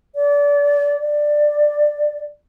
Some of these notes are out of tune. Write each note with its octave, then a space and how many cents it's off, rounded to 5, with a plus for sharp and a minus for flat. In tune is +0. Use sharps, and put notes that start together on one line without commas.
D5 -30
D5 +10